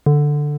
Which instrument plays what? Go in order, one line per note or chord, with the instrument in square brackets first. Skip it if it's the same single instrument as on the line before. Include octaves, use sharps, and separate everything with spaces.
[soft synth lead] D3